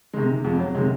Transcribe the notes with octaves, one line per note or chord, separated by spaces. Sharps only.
C3 D#3 G#3
F2 G#3
F#3
C3 D#3 G#3